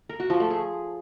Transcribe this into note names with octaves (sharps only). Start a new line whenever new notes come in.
A#4
F#4
F3
A3
G#4